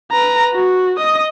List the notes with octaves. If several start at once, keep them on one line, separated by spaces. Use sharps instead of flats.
B4 A#5
F#4
D#5 D#6